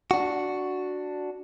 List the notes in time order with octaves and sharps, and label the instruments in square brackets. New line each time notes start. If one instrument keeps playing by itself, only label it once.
[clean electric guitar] D4 F#4